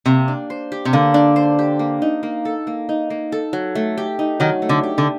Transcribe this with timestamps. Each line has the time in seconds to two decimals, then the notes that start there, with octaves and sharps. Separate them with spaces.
0.06 C3 A#3
0.28 D4
0.50 C5
0.72 G4
0.85 C3
0.93 D3 A#3
1.14 D4
1.36 C5
1.59 G4
1.79 A#3
2.02 D#4
2.23 A#3
2.45 A4
2.67 A#3
2.89 D#4
3.10 A#3
3.32 A4
3.53 F#3
3.75 A3
3.98 G4
4.19 D#4
4.40 D#3 F#3
4.62 A3
4.69 D3
4.83 G4
4.98 D3